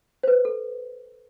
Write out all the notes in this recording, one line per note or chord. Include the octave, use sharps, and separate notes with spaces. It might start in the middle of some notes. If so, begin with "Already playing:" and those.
C5
B4
A4